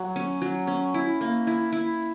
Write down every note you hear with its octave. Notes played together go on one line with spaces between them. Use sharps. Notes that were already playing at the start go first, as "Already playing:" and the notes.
Already playing: F#3
C#4
F#3
C#4
E4
A#3
E4
E4